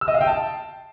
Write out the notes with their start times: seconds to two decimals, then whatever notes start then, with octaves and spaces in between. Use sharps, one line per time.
0.01 E6
0.08 D#5
0.14 F5
0.21 G5
0.27 A5